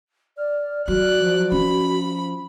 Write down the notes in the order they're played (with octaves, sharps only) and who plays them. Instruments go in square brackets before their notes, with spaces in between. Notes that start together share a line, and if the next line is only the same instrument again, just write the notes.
[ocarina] D5 [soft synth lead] F6
[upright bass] F#3 [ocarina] F#4 [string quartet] D5 F#6
[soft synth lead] F3
[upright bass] C#4 [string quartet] B5